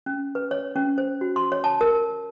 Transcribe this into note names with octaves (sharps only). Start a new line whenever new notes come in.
C#4
B4
C#5
C#4
C5
F#4
C6
C#5
A5
A#4